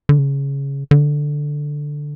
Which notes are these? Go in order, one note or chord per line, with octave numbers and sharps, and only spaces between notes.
D3
C#3
D3